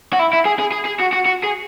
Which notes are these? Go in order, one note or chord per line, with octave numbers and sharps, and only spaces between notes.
F#4
E4
E4
G#4
G#4
G#4
G#4
F#4
F#4
F#4
G#4